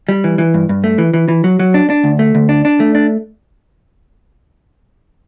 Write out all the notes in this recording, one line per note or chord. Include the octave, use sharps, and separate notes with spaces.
G3
E3
E3
G2
G2
A3
E3
E3
E3
F#3
F#3
D4
D4
D2
A3
D2
D4
D4
A3
D4